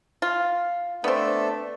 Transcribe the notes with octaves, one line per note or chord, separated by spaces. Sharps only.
F4
A3 B3 C4 D4 A4